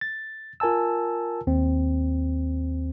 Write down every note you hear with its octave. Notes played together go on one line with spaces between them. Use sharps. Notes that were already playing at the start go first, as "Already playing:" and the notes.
A6
F4 A#4 G#5 A5 E6
D#2 C4